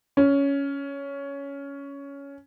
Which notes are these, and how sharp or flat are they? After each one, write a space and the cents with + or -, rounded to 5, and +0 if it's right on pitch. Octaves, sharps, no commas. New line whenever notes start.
C#4 +10